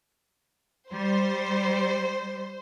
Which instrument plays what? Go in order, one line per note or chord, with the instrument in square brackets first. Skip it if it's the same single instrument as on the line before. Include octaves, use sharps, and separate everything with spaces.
[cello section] G3 [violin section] C5